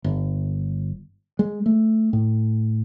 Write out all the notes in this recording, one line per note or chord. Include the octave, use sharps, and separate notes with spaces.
G1
G#3
A3
A2